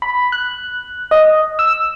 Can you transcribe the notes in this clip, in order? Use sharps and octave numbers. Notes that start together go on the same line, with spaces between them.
B5
F#6
D#5
E6